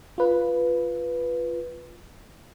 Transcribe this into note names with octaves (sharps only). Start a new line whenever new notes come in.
F4 B4